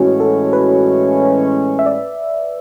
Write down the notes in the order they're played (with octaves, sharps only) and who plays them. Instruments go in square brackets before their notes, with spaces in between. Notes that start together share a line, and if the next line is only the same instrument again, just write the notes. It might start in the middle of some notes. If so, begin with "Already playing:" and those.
Already playing: [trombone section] A2 E3 G#3 C#4 [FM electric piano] F#4
[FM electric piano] A4
B4
E5
D5